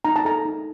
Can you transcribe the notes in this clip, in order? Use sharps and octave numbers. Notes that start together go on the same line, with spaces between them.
D#4 A#5
A5
A4 A#5
D#4